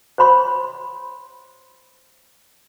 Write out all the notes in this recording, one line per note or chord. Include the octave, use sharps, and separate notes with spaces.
C5 C#5 B5 C6